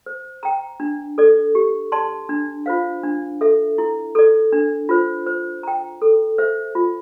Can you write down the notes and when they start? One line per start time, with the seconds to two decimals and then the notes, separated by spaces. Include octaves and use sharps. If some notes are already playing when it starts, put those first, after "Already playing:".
0.06 C5
0.43 G5 A#5
0.80 D4
1.18 A4 D5
1.55 G4
1.92 D5 A5 C6
2.29 D4
2.66 F4 C5 F5
3.03 D4
3.41 A4 E5
3.78 E4
4.15 A4 D5
4.53 D4
4.89 F4 C5
5.27 C5
5.63 G5 A#5
6.02 A4
6.38 C5 E5
6.75 F4